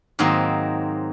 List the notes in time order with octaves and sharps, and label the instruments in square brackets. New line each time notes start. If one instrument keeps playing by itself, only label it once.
[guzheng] G#2 D#3 F#3 A#3 C4